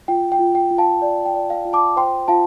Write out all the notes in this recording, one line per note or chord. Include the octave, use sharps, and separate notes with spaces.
F4 G5
G5
F4
G5
F4
F5 A5
D5
G5
D5
F5
F4
A5 D6
C5 G5 C6
F4 F5 A5